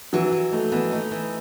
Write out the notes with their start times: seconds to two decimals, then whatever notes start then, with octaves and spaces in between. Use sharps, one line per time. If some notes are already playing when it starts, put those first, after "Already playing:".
0.13 E3 F#3
0.32 E3
0.52 A3 D#4
0.72 E3 B3
0.92 A3 D#4
1.11 E3